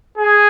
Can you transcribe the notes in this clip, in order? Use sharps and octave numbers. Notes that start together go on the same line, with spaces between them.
G#4